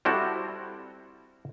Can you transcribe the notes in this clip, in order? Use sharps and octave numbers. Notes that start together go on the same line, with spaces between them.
G3 C4 E4 F#4 A4